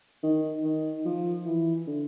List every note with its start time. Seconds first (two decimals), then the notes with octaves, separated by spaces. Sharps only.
0.23 D#3
0.64 D#3
1.05 F3
1.45 E3
1.87 D3